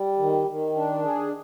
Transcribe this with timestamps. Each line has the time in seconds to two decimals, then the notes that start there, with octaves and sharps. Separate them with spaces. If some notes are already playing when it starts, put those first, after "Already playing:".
Already playing: G3
0.19 D#3
0.48 D#3
0.76 D4
1.04 G#4